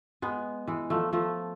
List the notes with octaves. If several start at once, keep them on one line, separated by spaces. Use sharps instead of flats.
G#3 B3
E3 G#3
F3 A3
F3 A3